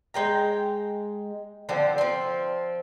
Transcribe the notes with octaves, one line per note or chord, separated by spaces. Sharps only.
G#3 G5 A#5
D3 F3 C4
F3 C4